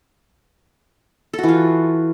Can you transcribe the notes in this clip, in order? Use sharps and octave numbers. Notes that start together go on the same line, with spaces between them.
E3 F4 F#4 A4